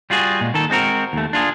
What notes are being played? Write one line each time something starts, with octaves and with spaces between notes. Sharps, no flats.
G3 F4 F#4 G#4
A#2 G#3
D#3 A4
G#3 C4 F#4 A#4
D#2 A3
D4 F4 G#4